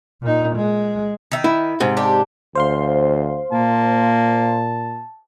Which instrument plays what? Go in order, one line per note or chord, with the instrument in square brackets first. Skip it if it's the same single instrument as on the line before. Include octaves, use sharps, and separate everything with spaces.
[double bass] A#2 D#4
G#3
[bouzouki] D#3 E5
[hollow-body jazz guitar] E4
G#2 C3
[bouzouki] D4 G4
[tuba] D2 [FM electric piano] C5 F5 C6
[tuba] A#2 [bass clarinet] A#3 [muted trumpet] A5